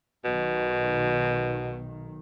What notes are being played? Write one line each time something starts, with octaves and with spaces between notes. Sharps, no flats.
B1 B2 D#3